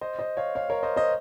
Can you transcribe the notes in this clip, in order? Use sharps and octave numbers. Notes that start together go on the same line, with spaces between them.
C5 D#5
C5 D#5
C#5 F5
C#5 F5
A#4 C#5
C5 D#5
C5 D#5